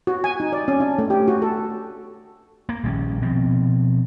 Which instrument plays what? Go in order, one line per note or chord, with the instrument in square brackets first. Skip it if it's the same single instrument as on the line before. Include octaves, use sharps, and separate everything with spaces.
[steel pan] F#4
G#5
D#4
D5
C#4
D4
A3
G4
F#4
A4
[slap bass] A#3
A#1 D#3 G3 C#4
B2 F3 C4